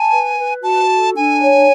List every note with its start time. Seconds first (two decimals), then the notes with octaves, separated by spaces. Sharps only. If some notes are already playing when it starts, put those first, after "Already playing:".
Already playing: G#5 A5
0.11 B4
0.37 B4
0.63 F#4 A5
0.90 A4
1.16 D4 G#5
1.41 C#5